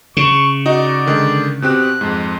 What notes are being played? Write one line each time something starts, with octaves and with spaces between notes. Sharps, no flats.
C#3 C#6
D#4 F#4 D5 D#5
D3 D#3 G#3
B2 C4 G4 F#6
F2 G#2